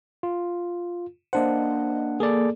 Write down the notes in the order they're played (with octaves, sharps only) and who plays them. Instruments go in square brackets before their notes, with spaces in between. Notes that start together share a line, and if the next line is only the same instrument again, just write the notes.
[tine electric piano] F4
[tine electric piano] A#3 D4 F#5 [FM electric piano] C5 D#5
[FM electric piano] A#3 [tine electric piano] G#4 A4 D5